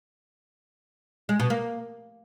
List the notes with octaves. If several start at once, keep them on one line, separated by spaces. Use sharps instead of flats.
G#3
B2
A#3